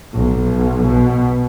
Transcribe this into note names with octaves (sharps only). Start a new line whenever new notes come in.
B1
B2